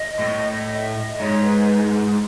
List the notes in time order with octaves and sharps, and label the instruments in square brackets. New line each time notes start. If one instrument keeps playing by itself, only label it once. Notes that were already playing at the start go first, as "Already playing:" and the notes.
Already playing: [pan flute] D#5
[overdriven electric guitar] A2
[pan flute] D#5
E5
D#5
[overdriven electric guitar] G#2 [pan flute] C#5
[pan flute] B4
B4